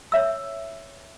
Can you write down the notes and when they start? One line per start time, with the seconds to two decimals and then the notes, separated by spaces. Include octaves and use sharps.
0.12 C#5 E5 E6